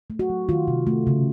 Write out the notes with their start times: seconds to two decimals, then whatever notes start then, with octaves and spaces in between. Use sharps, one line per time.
0.10 A3
0.19 F#4
0.30 F#3
0.49 D#3 F4
0.68 C3
0.87 A3
1.07 C#3